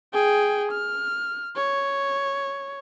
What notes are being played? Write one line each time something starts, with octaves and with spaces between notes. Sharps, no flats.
G#4 G5
F6
C#5